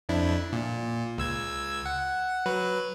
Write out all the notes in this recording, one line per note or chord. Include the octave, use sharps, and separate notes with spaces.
F2 D4 E4
A#2
C#2 E6 G#6
F#5
F#3 B4